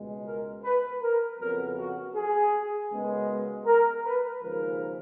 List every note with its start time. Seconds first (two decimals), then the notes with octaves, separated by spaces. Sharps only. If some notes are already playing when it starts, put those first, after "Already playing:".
Already playing: C#2 B2 G#3
0.25 A#4
0.63 B4
1.01 A#4
1.39 F2 C#3 F#3 B3 A#4
1.77 F#4
2.14 G#4
2.90 F#2 C#3 G#3 B3
3.65 A#4
4.03 B4
4.42 D#2 C#3 F3 G#3 A#4